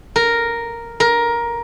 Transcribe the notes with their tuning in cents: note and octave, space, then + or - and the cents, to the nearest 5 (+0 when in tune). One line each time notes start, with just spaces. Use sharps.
A#4 +0
A#4 +15